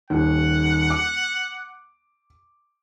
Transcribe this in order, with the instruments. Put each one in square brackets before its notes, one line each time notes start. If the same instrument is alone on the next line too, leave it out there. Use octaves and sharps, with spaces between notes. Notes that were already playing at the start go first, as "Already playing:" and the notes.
[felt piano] D#1 D#2 [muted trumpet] F#5
[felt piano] D6